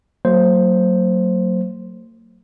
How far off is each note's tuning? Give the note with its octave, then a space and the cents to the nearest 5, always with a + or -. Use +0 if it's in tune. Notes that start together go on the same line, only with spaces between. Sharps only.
F#3 +5 A#3 -40 C5 +0